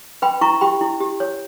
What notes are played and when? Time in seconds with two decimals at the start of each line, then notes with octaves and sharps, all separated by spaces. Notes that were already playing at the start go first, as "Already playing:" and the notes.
0.22 B4 G5 B5
0.41 E4 A#5 C#6
0.61 G4 G5 B5
0.81 E4
1.01 G4
1.20 C#5